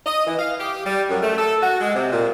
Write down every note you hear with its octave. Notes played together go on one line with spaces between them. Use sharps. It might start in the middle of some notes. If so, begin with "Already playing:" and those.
D#5
E3
F5
G4
G3
F#2
A3
A4
F#4
G#3
C3
A#2